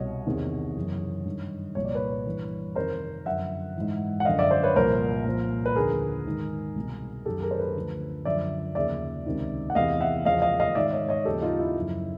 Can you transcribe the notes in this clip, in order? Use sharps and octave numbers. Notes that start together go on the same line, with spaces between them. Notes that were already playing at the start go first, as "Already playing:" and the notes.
Already playing: C2 B2 C#5 D#5
E2 C3 D#3
F#2 C#3 E3
G2 D#3
C2 A#2 F3 C#5
D5
B4 C#5
G2 E3
F2 C3 D#3 A#4 C5
F#2 D3 F3 E5 F#5
G#2 E3
F#5
F#2 D3 F3 D#5 F5
D5 E5
C5 D5
B4 C#5
C2 A#2 F3 A#4 C5
C2 A#2 F3
B4
D#2 D3 F3 G#4 A#4
G#2 D#3
C2 B2
F#2 D#3 G4 A4
G#4 A#4
C5
A4 B4
D2 D3 F3
F#2 D3 F3 D5 E5
D#2 C#3 F3 D5 E5
C#2 C3 D#3
F#5
E2 C3 E3 D#5 F5
E5 F#5
E2 C#3 F3 D#5 F5
D#5 F5
D#5 F5
G#2 D#3 D5 E5
C#5 D#5
C#5 D#5
D#2 C#3 F3 G4 A4
D#4 F4
E4
F#2 C#3 F3